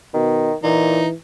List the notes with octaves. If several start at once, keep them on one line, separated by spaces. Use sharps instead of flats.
B2 D#3
A#2 E3 D#4